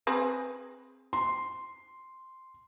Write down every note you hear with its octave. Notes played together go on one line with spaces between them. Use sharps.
C4 G#4 B4
C6